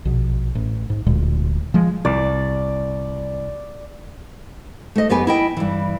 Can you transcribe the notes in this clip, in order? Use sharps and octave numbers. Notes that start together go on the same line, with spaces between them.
A#1 B2
A1
G#2
D1 D2 A#2 G#3
F3 G#3
C2 D5
A3 D#5
F#2 B3 G4 B4 G#5
E4 D#5 G5
G2 E3